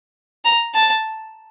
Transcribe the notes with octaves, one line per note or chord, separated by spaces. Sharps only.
A#5
A5